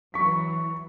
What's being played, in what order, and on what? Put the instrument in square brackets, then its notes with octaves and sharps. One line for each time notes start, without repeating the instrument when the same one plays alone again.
[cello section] E3 F#3 [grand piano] C#6 B6